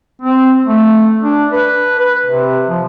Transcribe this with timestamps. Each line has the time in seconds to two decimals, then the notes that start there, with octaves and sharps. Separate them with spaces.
0.22 C4
0.66 A3
1.22 D4
1.52 B4
1.99 B4
2.26 C3
2.69 F3